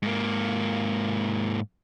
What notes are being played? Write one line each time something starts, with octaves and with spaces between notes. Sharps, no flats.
G#2 A#3